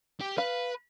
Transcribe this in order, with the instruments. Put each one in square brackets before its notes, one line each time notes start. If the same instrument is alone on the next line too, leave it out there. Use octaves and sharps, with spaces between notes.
[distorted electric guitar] G4
[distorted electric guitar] B4 [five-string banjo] F5